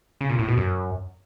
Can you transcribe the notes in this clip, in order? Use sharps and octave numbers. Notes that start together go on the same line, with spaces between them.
C#3
A#2
A2
B2
F#2